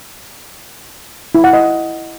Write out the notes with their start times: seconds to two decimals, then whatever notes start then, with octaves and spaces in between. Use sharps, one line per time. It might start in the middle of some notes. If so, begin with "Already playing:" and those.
1.35 E4
1.44 F#5
1.53 D#5